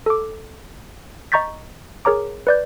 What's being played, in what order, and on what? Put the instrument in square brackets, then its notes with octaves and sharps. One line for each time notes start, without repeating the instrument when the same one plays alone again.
[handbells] A4 D6
D#5 A#5 C#6 G6 A6 B6
G#4 A#4 C#5 A#5 D6
B4 D5 G6